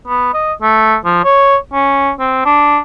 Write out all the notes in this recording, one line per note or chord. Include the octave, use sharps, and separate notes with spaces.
B3
D#5
A3
F3
C#5
C#4
C4
D4